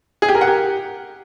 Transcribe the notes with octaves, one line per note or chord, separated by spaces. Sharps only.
G#4
G4
A#4
F#5
G4